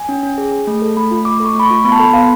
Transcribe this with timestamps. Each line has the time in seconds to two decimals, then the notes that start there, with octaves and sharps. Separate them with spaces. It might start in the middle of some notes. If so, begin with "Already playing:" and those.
Already playing: G#5
0.09 C#4
0.23 C#4
0.38 G#4
0.52 G#4
0.67 A3
0.82 A4
0.97 A3 B5
1.11 F4
1.25 A3 D6
1.40 A4 C#6
1.55 A3 B5
1.65 F4 C#6
1.84 B3 B5
1.92 A5
1.99 A4 B5
2.13 B3 F5